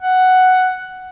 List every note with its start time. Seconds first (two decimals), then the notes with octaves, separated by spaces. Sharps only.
0.02 F#5